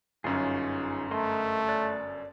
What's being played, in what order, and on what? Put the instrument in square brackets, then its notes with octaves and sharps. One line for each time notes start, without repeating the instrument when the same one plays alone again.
[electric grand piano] G1 F#2 C#4 [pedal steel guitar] D#4 F4 G#4
[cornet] A3 [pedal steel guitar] A#4 D#5 C6
[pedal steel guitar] D5 F#6